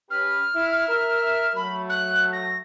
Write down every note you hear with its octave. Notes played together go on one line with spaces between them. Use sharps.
C#4 G4 B4 F6
E4
A#4 E5
F#3 A3 B5
F#6
A#6